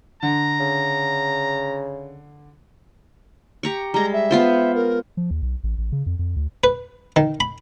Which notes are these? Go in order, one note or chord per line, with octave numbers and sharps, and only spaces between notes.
D3 A#5
C#3
G4 A#5 C#6
G3 G#3 A#5
E5
B3 F4 C5
A#4
F3
D#2
B1
A1
A1
C#3
F2
F2
D2
B4
D#3
B5